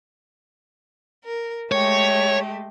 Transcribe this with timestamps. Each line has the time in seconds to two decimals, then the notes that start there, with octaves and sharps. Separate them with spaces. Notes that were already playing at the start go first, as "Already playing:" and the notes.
1.24 A#4
1.72 G#3 A3 G4 C#5